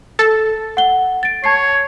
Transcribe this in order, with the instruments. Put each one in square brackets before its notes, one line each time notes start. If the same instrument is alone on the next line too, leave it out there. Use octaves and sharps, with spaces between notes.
[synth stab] A4 [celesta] A6
[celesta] F#5 G7
A6 D7
[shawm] C#5 [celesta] A5 G#6 C7